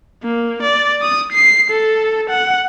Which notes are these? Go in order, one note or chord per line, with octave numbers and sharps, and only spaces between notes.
A#3
D5
D#6
C7
A4
F#5